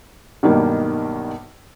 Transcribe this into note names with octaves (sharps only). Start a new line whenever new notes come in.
B1 G2 D#3 G3 A#3